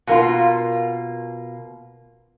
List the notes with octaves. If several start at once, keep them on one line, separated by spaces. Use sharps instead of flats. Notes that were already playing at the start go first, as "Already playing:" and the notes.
B2 A#3 F4